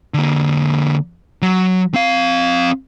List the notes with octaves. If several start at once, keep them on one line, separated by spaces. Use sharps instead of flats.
D3 A#3
F#3
C4 F5